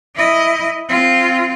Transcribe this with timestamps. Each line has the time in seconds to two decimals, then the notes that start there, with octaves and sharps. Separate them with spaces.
0.16 E4 D#5
0.89 C4 F4